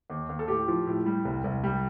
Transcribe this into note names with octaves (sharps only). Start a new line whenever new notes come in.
D#2
D#2
A4
A2 G4
F3
A2
G3
C2
C2
G3